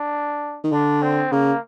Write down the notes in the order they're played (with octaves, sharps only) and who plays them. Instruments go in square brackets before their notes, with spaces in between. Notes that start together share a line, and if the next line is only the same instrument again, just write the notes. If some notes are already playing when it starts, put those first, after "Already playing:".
Already playing: [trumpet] D4
[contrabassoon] D#3
[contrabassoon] D3 [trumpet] D4
[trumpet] C4
[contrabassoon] C#3 [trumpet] A#3